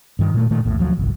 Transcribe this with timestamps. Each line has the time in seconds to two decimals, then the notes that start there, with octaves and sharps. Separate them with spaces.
0.19 G2 D#3
0.34 A#2 A3
0.51 A#2 D#3 A3
0.65 A#1 E2 A2
0.79 D2 F3 F#3
0.97 G1 C2